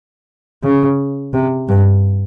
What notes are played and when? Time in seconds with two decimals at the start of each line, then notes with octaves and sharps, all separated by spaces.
0.64 C#3
1.33 C3
1.69 G2